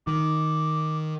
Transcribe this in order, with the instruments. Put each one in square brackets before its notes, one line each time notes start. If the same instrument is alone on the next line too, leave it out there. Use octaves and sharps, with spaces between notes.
[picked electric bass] D#3 [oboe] D6